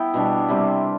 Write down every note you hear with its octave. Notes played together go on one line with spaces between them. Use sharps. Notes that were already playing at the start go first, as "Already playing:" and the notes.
Already playing: B3 E4 G5
B2 G3 D4
C3 G3 C4